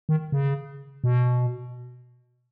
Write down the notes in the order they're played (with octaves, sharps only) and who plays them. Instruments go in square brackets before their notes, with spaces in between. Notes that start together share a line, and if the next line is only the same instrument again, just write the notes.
[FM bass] D#3
C#3
B2